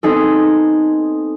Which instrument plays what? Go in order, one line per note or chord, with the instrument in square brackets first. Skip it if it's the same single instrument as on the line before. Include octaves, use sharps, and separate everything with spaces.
[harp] B3 C4 D#4 G#4 A4